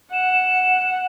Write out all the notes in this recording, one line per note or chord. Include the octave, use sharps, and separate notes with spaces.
F#5 E7